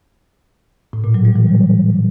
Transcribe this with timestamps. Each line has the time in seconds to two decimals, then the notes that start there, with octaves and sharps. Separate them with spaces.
0.93 A2
1.04 A#2
1.14 F#3
1.25 G3
1.36 E3